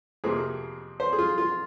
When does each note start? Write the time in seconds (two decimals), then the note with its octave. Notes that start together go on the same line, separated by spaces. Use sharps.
0.24 F2 C3 F3 A#3 G#4
1.00 C5
1.13 G#4
1.19 F4
1.38 F4